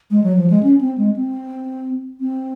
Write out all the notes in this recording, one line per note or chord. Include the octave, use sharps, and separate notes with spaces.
G#3
F#3
F3
G#3
C#4
C4
G#3
C4
C4